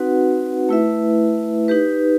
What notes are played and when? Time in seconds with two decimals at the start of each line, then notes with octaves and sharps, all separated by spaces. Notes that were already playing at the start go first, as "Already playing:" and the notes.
Already playing: C4 D#4 F#4 B4 F#5
0.69 A3 E4 B4 E5
1.68 D#4 G4 B4